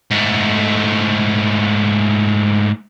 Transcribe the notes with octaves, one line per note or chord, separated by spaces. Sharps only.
G#2 A3